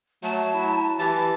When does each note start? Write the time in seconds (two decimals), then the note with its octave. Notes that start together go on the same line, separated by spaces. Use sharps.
0.23 F#3 A3 A5
0.54 E4
0.99 E3 G4 A5